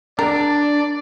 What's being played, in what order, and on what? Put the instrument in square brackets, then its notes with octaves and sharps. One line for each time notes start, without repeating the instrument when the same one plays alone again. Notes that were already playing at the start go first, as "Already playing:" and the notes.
[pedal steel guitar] D4 [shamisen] A#4 [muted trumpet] D5